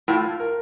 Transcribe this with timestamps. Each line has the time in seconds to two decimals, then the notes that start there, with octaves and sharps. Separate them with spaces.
0.08 A2 F4
0.40 A#4